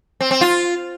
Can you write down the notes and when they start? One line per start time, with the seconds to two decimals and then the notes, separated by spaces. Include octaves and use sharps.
0.21 C4
0.31 C4
0.41 F4